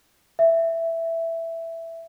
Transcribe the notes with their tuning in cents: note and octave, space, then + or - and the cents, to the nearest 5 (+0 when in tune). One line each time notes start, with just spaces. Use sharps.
E5 +5